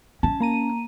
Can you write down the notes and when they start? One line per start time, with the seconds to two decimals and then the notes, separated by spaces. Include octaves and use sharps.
0.23 C#4 A5
0.40 A#3 A#5 D#7